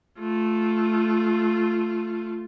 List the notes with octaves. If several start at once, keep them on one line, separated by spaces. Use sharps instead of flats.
A3 F4